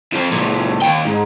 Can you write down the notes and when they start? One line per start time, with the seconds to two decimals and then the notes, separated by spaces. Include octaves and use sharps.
0.12 F2 F3
0.32 C#2 A#2
0.82 D#2 G5
1.06 G#2